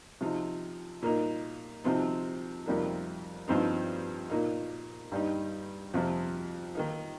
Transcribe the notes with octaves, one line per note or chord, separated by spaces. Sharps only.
C3 F3 D#4
A#2 A#3 D#4
C3 F3 C4 D#4
F2 C3 G3 A#3 D#4
G2 F3 C4 D#4
A#2 A#3 D#4
G2 G3 D#4
F2 C3 F3
D#3 A#3 D#4